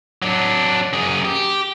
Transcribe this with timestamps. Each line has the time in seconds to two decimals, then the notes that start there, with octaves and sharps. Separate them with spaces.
0.22 F#3 D4
0.93 F#2 G#4
1.25 G4